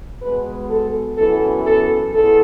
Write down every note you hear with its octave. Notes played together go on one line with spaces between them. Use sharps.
B2 G#3 B3 B4
A4
F#2 E3 B3 A4
A4
E2 A4